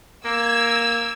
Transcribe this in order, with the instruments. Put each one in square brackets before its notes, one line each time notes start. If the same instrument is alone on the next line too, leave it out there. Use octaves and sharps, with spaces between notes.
[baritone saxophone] A#3 [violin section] E6 G#6